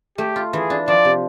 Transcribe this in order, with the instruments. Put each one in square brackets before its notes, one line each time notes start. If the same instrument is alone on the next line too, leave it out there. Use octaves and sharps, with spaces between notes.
[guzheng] A3 [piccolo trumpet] G4
[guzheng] F4
[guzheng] E3 [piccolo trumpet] G#4
[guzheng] D4
[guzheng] F3 [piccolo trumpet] D5
[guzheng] C3